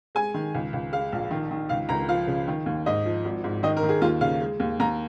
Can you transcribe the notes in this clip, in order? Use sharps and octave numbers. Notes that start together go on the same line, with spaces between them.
G#3 G#5
D#3
C#2
C#2
G#3 F5
A#1
D#3
D#3
C#2 F5
C#2 A#5
F3 F5
C#3
D#3
D#2
G#2 D#5
F3
G#1
G#2
D#3 D#5
A#4
D#3
G#4
D#2 F4
C#3 F5
G#3
D#2
D#2 A#5